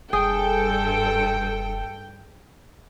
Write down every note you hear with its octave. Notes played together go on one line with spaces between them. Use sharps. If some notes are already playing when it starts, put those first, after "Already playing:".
F1 G2 G#4 A4 G5